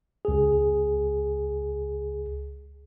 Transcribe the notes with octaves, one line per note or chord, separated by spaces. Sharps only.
C#2 G#4